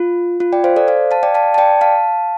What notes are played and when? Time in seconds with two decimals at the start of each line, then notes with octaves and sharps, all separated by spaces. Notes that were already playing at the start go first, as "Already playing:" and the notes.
Already playing: F4
0.40 F4
0.53 D5 G5
0.64 C5 F5
0.76 A4 D5
0.88 C5 F5
1.11 F5 A5
1.23 D5 G5
1.34 F5 A5
1.54 A5
1.58 D5 G5
1.81 F5 A5